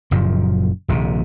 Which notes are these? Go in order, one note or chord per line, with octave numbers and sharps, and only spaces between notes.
F#1 F#2 A#2 F3
D#1 A#1 C3